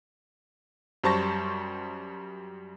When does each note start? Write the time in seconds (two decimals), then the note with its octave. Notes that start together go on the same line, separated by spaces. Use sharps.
1.04 F#2 G3 C5 A5 C#6 A#6